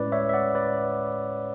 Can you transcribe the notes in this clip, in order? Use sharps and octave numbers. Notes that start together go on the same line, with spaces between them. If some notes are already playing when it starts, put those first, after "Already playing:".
Already playing: A2 G#3 C#4 E4 B4 D5
C#5 E5
E5
D5 F#5
B4 D5